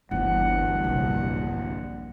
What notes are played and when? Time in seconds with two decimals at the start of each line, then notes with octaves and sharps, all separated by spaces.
0.11 G1 D2 G2 D3 E3 F#5
0.84 A#1 C3